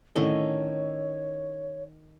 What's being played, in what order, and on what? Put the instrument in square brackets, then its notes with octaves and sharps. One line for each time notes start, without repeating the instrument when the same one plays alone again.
[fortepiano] A2 D3 [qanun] D#3 C#4 D#5 [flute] C#5